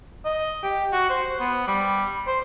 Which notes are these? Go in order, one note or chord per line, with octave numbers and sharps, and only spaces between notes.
D#5
G4
F#4
C5
B3
G3
C5